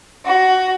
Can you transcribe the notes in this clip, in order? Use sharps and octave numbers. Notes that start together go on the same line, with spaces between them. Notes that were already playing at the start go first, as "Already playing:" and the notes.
F#4